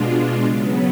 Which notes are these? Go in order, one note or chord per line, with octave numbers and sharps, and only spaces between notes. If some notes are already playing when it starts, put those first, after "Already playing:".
Already playing: B2 G#3 D4 F4
C#3 F#3 B3